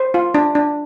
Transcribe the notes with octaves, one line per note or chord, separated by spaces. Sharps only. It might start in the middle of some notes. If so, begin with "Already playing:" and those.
Already playing: C5
F4
D4
D4